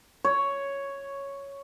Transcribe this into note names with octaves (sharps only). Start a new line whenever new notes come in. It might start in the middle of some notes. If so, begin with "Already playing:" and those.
C#5